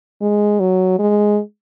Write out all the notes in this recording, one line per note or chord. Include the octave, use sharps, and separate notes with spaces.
G#3
F#3
G#3